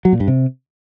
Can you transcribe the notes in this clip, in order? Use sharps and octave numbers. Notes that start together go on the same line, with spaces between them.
F#3
A#2
G2
C3